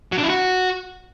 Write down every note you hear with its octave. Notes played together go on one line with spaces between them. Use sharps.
F#3
D4
E4
F#4